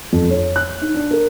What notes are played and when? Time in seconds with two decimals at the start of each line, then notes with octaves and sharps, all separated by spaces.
0.13 F2
0.31 C#5
0.56 F#6
0.81 D#4
0.94 D4
1.11 A#4